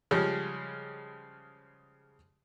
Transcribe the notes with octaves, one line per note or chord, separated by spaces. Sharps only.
C#3 F3 G3 G#3